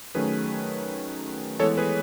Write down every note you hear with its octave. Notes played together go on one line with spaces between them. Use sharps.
D#3 F#3 A3 C#4 G#4 B4
E3 G#3 B3 A4 C#5
G#4 B4